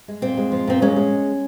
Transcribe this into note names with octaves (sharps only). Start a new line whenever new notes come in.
G#3
A#2 C4
G#3
F3
A#2 C4
G#3 C#4
G#3